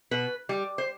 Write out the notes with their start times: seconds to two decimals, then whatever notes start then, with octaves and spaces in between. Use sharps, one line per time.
0.11 B2 B4
0.49 G3
0.78 C5